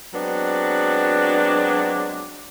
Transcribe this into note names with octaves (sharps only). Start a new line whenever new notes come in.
F#3 G#3 B3 C4 D4